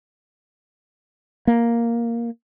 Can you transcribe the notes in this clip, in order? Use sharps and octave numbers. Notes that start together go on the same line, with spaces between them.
A#3